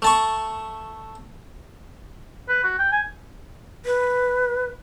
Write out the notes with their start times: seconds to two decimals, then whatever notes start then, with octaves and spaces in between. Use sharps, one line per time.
0.02 A3 A5 C#6
2.49 B4
2.64 F#4
2.79 G5
2.92 G#5
3.85 B4